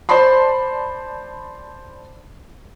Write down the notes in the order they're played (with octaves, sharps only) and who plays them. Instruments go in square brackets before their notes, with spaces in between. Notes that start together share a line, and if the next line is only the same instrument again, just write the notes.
[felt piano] C5 D5 A5 B5 C6